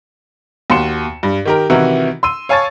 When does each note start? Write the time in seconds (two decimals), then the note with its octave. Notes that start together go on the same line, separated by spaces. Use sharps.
0.70 D#2 F#4 C6 C#7 E7
1.23 G2
1.45 D#3 G4 A#4
1.70 C3 D#3 E3 E4 F#4 A#4
2.23 C6 E6 D#7
2.49 C#5 F5 G#5 A5 C#6 A6